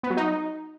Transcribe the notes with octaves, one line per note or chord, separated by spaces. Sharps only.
B3
F#3
D#4